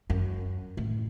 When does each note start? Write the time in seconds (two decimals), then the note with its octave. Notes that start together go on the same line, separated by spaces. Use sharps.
0.10 F#2
0.77 A2